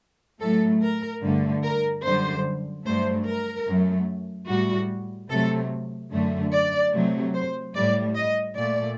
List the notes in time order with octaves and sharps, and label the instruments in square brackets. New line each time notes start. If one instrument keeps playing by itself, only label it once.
[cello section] A2 F#3 A3 A4
A#4
G2 D3 A3
A#4
F#2 D3 G3 C5
G2 F#3 A3 C5
A#4
F#2 F#3 A3
A2 G3 F#4
C3 F#3 A3 A4
F#2 D3 A3
D5
C3 F#3 A3
C5
A2 G3 D5
D#5
A#2 A3 D5